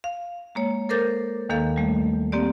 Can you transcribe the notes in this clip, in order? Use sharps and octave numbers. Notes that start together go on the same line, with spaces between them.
F5
G#3 A#3 C#5
A4 A#4 C5 D6 G6 A6
D#2 D#3 A#3 A4 F5
G3 A3
A#3 C4 G4 D5